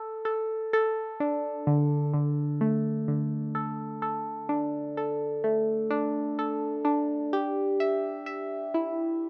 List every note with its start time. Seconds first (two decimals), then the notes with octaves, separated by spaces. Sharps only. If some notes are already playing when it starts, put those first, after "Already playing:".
Already playing: A4
0.25 A4
0.73 A4
1.20 D4
1.67 D3
2.14 D3
2.61 A3
3.08 D3
3.55 A4
4.02 A4
4.49 D4
4.97 A4
5.44 A3
5.90 D4
6.39 A4
6.85 D4
7.33 G4
7.80 E5
8.26 E5
8.74 E4